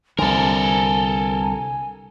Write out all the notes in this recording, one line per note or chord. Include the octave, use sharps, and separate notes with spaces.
C2 D3 A4 A#4 G#5